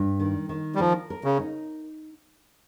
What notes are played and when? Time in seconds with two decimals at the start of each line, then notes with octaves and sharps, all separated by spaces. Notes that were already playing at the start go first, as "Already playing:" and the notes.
Already playing: G2
0.20 D#3
0.49 D#3
0.75 G3
0.80 F3 A#4
1.10 A#4
1.24 C#3
1.40 D#4